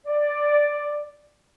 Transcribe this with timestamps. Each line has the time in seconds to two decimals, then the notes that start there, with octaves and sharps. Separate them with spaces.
0.05 D5